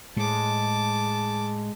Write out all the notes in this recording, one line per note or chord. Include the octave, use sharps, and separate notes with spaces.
A2 G#3 A5 D6